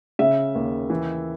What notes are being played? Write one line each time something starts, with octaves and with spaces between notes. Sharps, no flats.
C#3 E5
D#2
E3